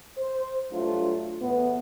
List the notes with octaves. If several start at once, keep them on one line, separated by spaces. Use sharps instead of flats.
C5
G2 F#3 A3 D4 F4
E2 A2 B3